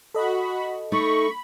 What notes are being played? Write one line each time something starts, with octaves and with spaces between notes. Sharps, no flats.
F#4 A4 D#5 B5
A3 D#4 B5 C#6